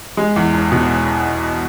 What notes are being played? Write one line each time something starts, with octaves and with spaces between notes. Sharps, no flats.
G#3
E2
E1
B2